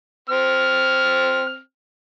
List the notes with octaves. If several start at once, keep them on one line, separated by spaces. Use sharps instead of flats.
C4 F6